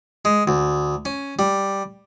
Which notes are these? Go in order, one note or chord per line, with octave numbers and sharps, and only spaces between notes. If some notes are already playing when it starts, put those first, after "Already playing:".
G#3
D2
C#4
G3